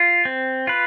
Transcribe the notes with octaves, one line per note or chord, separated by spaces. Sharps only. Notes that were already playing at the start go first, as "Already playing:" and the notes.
Already playing: F4
C4
F4 B4